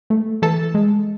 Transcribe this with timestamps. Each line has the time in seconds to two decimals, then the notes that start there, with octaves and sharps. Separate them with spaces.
0.10 A3
0.42 E3 A4 A5
0.75 G#3